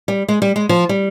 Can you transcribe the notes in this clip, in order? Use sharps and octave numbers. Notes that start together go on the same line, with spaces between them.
G3
G#3
G3
G#3
F3
G3